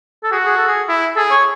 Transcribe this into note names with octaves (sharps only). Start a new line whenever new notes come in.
A4
F#4 G#4
G#4
A4
G#4
E4
G#4 A4
C#5